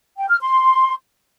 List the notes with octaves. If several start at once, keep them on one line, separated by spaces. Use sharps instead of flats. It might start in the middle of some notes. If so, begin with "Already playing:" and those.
G5
F6
C6